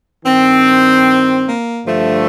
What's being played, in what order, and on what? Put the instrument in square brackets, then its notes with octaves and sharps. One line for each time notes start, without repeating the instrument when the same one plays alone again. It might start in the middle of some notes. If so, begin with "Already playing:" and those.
[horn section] G2 D#3 C4
A#3
G2 D3 F3 A3